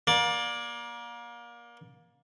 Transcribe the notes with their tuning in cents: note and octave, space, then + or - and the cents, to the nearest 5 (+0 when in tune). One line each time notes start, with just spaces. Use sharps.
A#3 +30 D5 +0